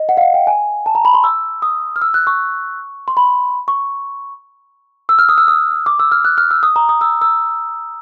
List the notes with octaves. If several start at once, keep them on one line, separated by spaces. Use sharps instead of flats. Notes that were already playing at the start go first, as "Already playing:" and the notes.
Already playing: D#5
F#5
F5
F#5
G5
G#5
A5
A#5
B5
C6
E6
D#6
F6
E6
F#6
C#6
C6
B5
C#6
E6
F6
D#6
E6
D#6
D6
E6
F6
F#6
F6
E6
D#6
A#5
D#6
E6
E6